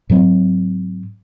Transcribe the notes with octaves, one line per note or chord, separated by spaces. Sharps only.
G#2 F#3 C4